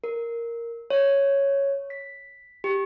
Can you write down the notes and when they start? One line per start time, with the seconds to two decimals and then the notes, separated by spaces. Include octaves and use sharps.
0.04 A#4
0.90 C#5
1.90 B6
2.64 G4